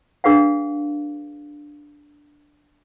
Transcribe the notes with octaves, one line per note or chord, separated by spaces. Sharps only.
D4 G#4 B4 F5 F#5